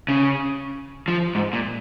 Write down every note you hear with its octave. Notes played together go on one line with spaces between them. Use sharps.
C#3
F3
G#2
A#2